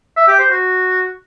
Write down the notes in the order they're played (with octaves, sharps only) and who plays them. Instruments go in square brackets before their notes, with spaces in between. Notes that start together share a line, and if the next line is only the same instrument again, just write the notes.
[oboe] E5
G4
C5
F#4